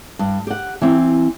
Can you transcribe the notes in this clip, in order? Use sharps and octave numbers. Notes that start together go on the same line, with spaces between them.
G2
G4 F#5
E3 C4